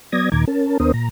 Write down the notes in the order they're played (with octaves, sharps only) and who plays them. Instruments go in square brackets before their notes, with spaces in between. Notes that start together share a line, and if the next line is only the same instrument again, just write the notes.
[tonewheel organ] F#3 B3 D5 D#6 G#6 A#6
D#2 A#2 D#3 A#5 D6 G#6
C#4 A#4 A5
D#2 B3 D4 A#4 C5 D#6
A#2 A#5